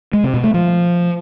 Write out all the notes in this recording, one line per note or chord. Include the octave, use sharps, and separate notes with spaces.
G#3
C3
B2
A3
F3